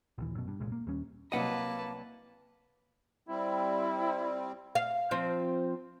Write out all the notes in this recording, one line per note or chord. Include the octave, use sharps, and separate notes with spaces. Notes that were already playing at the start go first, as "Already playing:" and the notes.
A#1 D#2 E3
F#2 B2
G2
C2 A#2 G#3
A#3
D#2 G3 C#4
C2 F#3 A#3 B4 D#5 F#5 A5
G3 C4 E4
F5
F3 C4